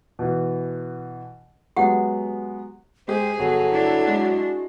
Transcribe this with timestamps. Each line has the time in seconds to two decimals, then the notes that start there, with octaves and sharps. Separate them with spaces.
0.19 B2 E3
1.76 F#3 G#3 B3 G4 F#5
3.08 G#3 G4 G#4 C5
3.39 G1 F#3 A4
3.70 D4 E4
4.07 G#3 F#4